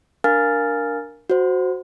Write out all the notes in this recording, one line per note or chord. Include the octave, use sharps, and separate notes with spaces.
D4 A#4 F5 G#5 F6 A6
F#4 C5